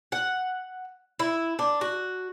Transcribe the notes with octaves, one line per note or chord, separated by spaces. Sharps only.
F#5
E4
D4
F#4